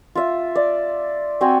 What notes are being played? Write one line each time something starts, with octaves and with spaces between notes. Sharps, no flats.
F4 E5
D5
C4 F#4 G5 G#5